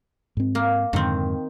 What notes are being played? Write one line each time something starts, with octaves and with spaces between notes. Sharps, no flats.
G#2 C4
A#3
F2 G#2 D3 D#3 C4